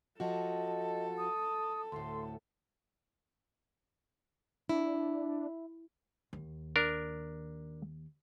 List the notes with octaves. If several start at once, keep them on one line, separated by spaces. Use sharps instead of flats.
F3 F#4 A4 D#5
D#6
D2 A2 C6
D4 E4
D#2
D4 A#4